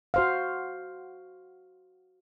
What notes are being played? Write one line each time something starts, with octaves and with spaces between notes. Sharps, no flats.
F#4 C5 F5